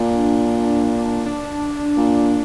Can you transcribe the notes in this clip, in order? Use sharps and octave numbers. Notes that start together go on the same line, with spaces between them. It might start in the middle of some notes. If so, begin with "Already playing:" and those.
Already playing: A#2 D4
D4
A#2